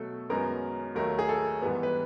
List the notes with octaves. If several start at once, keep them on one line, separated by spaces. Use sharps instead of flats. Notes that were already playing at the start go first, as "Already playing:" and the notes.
Already playing: B2 F#3 A3 A4
F#2 D#3 G#3 B3 A#4
D#2 D#3 F#3 A3 A#4
G#4
A4
G#2 E3 G3 B3
B4